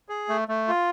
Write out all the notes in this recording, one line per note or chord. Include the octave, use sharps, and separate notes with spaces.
G#4
A3
A3
F4